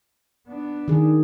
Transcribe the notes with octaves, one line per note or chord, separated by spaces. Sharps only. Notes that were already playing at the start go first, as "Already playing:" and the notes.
B3 D4
D#3 G#4